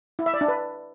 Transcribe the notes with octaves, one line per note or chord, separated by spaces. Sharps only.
E4
E5
D5
D4
B4